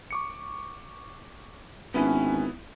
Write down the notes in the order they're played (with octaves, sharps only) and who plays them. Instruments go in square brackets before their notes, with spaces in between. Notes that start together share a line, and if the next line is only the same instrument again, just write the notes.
[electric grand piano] C#6 D6 C#7
[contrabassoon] G#1 [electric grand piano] B3 E4 B4 [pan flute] C#4